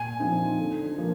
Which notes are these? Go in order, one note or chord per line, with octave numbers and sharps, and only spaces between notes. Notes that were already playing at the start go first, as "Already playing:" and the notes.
Already playing: A#2 G#5
F3 C4 D#4
D3
F3 A#3